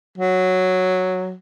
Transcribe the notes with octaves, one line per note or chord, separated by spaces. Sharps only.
F#3